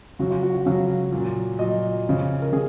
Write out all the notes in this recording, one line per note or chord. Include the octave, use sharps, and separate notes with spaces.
C#3 F#3 F#4
F4
F#4
F#4
C#3 F#3 F5
A#2 F#3
A#2 F#3 D#5
C#3 F3
A#4
C#3 G#4